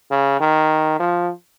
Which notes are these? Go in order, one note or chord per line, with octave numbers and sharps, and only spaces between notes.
C#3
D#3
F3